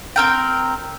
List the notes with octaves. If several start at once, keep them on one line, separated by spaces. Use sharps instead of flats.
C4 A#4 G5